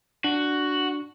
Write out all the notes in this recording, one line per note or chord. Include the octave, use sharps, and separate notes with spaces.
D4 F#4